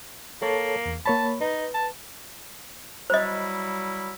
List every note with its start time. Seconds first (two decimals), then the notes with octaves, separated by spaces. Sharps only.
0.42 A#3 A4 C#5 A5
0.86 E2
1.05 A#3 C#5 A5 B5
1.41 D#4 B4
1.74 A5
3.10 F#3 G3 E4 C5 D#5